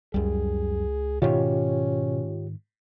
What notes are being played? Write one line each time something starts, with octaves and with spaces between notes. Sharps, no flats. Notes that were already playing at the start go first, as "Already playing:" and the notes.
C#2 F#2 G3 G#4
G#2 B2 D#3 C#4 F4 G4 C#5